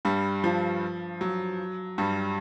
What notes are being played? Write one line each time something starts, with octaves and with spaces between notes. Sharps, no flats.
G2 G3
F3
F#3
G2 G3